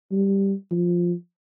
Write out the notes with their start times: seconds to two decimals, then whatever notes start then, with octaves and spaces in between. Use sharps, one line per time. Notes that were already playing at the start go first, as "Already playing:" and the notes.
0.11 G3
0.71 F3